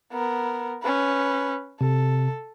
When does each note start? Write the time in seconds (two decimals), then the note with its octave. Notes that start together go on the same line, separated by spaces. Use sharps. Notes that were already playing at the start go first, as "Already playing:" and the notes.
0.12 B3 A#4
0.83 C#4 B4
1.81 C3 A4